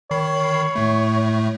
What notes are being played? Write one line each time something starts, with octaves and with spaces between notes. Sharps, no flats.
D#3 C#5 B5 C7
A2 A3